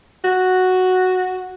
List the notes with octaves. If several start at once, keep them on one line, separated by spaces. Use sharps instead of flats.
F#4